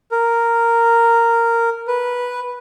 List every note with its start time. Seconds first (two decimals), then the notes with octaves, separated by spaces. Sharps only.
0.12 A#4
1.88 B4